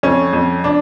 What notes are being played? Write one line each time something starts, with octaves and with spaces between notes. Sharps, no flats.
F2 C#4
F2
D4